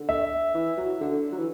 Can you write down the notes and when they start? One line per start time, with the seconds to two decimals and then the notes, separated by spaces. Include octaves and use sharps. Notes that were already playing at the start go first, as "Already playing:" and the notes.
Already playing: D3
0.09 E5
0.55 E3
0.78 F#3
1.00 D3
1.32 F#3
1.39 E3